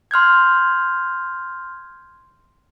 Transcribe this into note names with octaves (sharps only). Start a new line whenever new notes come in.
C6 F6 G6 G#6